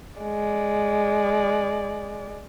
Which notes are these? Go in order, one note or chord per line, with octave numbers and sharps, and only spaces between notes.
G#3 D5